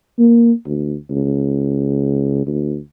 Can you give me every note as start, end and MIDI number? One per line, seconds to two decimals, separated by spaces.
0.19 0.52 58
0.66 0.95 38
1.10 2.43 37
2.46 2.78 38